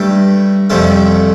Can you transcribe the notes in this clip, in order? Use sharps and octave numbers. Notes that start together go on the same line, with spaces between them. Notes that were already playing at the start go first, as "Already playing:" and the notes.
Already playing: G2 G3 A3 A4
F2 C3 G3 A3 A4